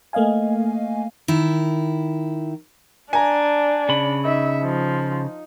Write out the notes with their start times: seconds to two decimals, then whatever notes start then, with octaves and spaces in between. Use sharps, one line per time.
0.13 A3 A#3 D#5 F5 G#5
1.28 D#3 E4
3.13 D4 G#5 A#5
3.89 C#3 B5
4.25 D#4 E5
4.63 F3